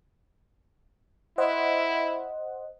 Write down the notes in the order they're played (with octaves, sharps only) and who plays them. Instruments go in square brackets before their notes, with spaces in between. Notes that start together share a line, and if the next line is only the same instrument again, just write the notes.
[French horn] E4 [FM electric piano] C5 D#5 F#5